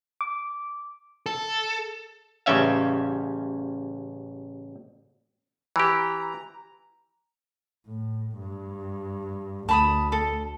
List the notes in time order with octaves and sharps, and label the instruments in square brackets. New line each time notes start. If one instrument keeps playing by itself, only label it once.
[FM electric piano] D6
[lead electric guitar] A4
[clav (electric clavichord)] A1 C#3 G3 C#4 E5 F5
[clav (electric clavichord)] E3 G4 [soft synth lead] A#5
[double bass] A2
G2
[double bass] D2 [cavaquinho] A5 B5 D#6
[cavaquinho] A4